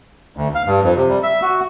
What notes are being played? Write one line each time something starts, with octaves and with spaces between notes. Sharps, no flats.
D2
F5
G2
F2
C3
G3
E5
F#4